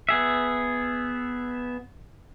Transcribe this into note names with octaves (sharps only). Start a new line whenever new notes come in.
B3 G#4 E5